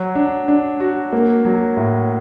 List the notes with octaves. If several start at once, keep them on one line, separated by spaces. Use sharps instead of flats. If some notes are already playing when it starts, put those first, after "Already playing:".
Already playing: F#3
D4
D4
F#4
A#3
F#3
A2